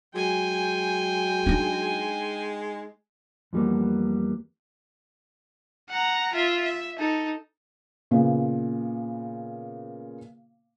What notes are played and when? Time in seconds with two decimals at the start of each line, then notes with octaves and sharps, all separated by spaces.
0.15 F#3 G#3 G5 G#5
1.46 D4 D#4
3.53 F2 E3 G3 A#3 B3
5.89 F#5 A#5
6.33 F4 E5
6.65 E5
6.99 D#4 A4
8.11 A#2 C#3 B3